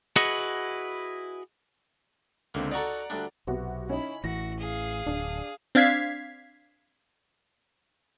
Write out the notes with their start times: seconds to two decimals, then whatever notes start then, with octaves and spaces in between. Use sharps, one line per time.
0.16 E4 F#4 G#4 B4 D#5 F#5
2.54 C#2 D3 A#3 C4
2.71 D#4 F#4 A4 D5 F#5 A#5
3.10 D2 G3 D4
3.47 B1 C3 B3 F#4
3.89 C#4 D#4 E4 B5
4.24 A1 E3 F#4 A#6
4.59 G#4 F5
5.06 D1 D4
5.75 C4 D4 F5 G#6 B6 C7